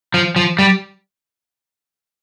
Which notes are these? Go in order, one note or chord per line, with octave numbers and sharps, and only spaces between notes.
F3
F3
G3